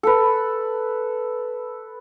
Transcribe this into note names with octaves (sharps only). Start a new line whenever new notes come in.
A4 B4